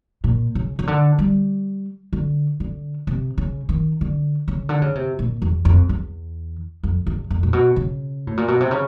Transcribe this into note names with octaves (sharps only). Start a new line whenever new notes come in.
A#2
C#3
C#3
D3
G3
D3
D3
C3
C#3
D#3
D3
C#3
D3
C#3
C3
A#2
E2
F2
E2
F2
E2
F2
A#2
B2
C#3
A2
A#2
B2
C3
C#3